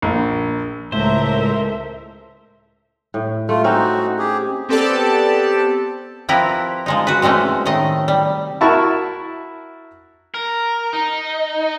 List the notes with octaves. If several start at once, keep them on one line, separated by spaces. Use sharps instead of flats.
A#1
C#2 A2 A4 A#4 C5 E5
A2
A3 F4
C4 C#4 D#4 F#4
G4 G#4
B3 C4 G4 A4 D5 A5
F3 C4 E4 G4 A#4 B4
F3 G#3 D#4
F#4 B4
C3 E3 G#3 A3 C#4
A2 D#3 A3 D#5
G3
E4 F#4 A#4 A5 C#6
A#4
D#4